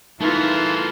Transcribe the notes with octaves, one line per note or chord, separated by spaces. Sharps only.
E3 A3 D#4 F4 A#4